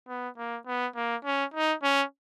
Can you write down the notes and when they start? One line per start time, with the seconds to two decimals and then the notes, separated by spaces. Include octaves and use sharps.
0.08 B3
0.38 A#3
0.67 B3
0.96 A#3
1.25 C#4
1.54 D#4
1.83 C#4